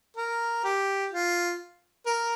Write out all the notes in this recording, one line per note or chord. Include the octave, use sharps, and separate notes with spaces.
A#4
G4
F4
A#4